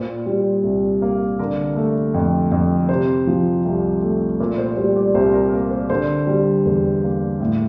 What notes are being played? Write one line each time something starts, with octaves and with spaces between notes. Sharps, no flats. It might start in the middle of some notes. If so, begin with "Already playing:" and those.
Already playing: A#2 C5
G3
C2
A#3
D3 A#4
A3
F2
F2
C3 C5
F3
C2
A3
A#2 A#4
C5
G3 C5
D5
C2 C5
A#4
A#3 A#4
C5
D3 C5
G3
E2
A#3
A2